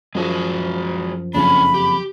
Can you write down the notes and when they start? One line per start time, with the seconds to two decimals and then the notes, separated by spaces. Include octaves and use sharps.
0.15 F#2 F3 G#3 F#4 G#4
1.35 F#1 F2 C#3 C#4 D4 B5
1.74 G4